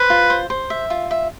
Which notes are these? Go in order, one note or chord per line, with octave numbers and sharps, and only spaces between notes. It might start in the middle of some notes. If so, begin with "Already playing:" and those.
Already playing: B4 C5
F4
C5
C5
E5
F4
E5